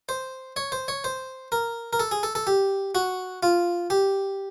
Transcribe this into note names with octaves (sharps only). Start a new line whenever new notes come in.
C5
C#5
C5
C#5
C5
A#4
A#4
A4
G#4
A4
A4
G4
F#4
F4
G4